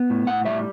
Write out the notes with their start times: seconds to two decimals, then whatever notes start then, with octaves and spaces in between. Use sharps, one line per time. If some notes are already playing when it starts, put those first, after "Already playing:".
Already playing: B3
0.10 A2
0.27 A2 F#5
0.45 G3 E5